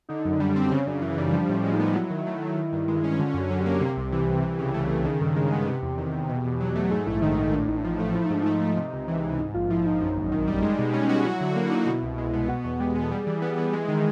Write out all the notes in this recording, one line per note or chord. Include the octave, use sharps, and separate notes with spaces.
D3 D#4
F#2
G3 D4
C4
C#3 C#4
F#2 D4
E3 E4
G3 D#4
F3 D4
A2 C#4
G#3
D#4
B3
F#3 E4
D#3
A3
D#3
D#3
G2
G#3
C#4
D3 F4
F#2
F#4
F#3
G4
A#3
C3
C2
E3
C2
E3
C#3
A3
C#3
D#3 G#4
G2 A4
G#3 A#4
B3 G#4
C3 G4
E2
D#3
E2
B2
E2
F#3
A3
G#2 G#4
A#1 E4
D#3 D#4
A#1 D#4
A2 D4
A1 D#4
D4
F3 D#4
A3
F3 E4
D#4
G#2 D4
A3 D#4
G#2
C3
C#2
E3
C#2
G#2
A#1 F4
F3 E4
A#1 D#4
F#2
G#1
D#3
G3
G#3
B2
C#4
F#4
F#3 E4
D3
A#3
D#4
B2
C2
G#3
B3
B2 F#4
E2 F#4
G#3 G4
B3 G#4
A4
G3 G#4
E3
B3
E3
G#3
D#3